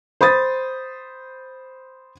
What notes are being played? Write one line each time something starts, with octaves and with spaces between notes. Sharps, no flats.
C5 B5 D#6 A6